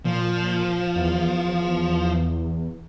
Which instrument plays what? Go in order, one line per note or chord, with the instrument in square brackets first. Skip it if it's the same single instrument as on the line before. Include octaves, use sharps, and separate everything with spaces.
[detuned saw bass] A#2 [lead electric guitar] F3
[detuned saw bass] E2